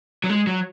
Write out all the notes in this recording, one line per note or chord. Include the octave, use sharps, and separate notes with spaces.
F#3
G#3
F#3